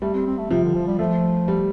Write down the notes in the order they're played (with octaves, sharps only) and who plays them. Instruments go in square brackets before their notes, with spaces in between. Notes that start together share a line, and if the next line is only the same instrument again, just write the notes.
[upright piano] G3 [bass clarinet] A3
[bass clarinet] C4
C4
A3
[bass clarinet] C3 [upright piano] F3
[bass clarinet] D3
F3
G3
[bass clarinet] F3 [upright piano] A3
[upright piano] G3